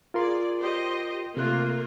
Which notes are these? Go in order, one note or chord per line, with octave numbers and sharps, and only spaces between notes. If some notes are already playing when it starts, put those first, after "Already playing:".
F4 G#4 A#4 D5 C6
G4 C5 D#5
C3 A3 A#3 F4 F#6